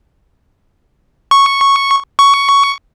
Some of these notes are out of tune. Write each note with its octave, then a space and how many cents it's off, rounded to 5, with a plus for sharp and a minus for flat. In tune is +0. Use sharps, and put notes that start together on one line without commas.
C#6 -5
C#6 +10